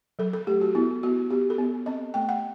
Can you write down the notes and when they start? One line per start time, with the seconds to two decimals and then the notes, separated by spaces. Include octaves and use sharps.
0.19 F#3 A4
0.33 A4
0.47 A3 G4
0.61 F#4
0.75 B3 E4
1.03 B3 F#4
1.30 B3 G4
1.50 A4
1.58 B3
1.86 C4 D#5
2.14 A3 G5
2.29 F#5